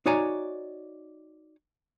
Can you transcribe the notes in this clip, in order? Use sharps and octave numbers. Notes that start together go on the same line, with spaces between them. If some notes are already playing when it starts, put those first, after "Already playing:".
D#4 F#4 C#5 D5 G#5 A#5